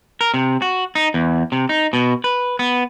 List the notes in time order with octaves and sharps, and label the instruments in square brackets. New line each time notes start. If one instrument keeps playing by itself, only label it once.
[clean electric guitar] A#4
C3
F#4
D#4
E2
C3
D#4
B2
B4
B3